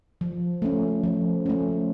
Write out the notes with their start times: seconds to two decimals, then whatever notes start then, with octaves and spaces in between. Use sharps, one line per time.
0.21 F3
0.62 A3 C#4
1.04 F3
1.46 A3 C#4